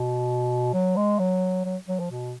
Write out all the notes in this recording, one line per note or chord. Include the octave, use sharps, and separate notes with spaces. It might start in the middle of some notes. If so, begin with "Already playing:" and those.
Already playing: B2
F#3
G#3
F#3
F#3
F#3
F3
B2